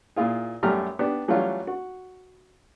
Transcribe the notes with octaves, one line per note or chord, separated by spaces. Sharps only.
A#2 E4 F4 G#4
F#2 G3 A3 G4 A#5 F6
B3 D4 G4
E3 F#3 G3 A3 C#4 F4
F#4